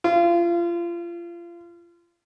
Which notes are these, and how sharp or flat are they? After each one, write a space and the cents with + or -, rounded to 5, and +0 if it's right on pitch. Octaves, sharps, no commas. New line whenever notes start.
F4 -30